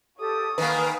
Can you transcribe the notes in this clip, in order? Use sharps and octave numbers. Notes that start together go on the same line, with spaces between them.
G4 A4 C#5 D#6
D#3 A#3 B4 F5 F#5 G#5